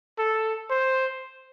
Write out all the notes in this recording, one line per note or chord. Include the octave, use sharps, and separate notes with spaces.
A4
C5